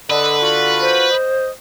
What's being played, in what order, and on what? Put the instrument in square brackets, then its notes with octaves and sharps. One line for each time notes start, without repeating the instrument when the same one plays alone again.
[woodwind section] D3 [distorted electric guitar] B4 [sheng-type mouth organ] D#5 E6
[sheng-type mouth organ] F4 F#4
[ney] C5
[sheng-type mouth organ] D#5